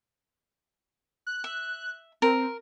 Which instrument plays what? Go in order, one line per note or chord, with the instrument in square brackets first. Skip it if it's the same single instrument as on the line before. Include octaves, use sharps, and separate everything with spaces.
[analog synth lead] F#6
[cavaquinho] E5
[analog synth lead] C4 [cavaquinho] A#4